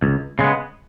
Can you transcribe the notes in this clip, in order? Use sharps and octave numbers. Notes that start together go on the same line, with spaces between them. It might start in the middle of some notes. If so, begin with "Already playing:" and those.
C#2
C#3 G#3 B3